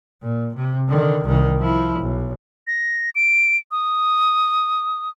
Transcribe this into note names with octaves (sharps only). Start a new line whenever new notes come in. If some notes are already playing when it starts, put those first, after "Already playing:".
A#2
C3
D3 D#3
C2 D#3
F3 E4
B1
A#6
D7
D#6